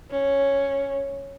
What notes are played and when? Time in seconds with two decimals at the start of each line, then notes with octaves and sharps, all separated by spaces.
0.11 C#4